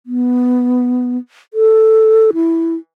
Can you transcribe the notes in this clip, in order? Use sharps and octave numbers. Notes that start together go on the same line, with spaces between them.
B3
A4
E4